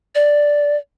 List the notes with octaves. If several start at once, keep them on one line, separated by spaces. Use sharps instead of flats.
D5